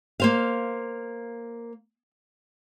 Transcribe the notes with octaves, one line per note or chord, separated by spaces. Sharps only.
A#3 C5 F5